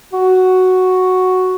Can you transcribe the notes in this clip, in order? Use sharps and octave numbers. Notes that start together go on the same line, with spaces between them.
F#4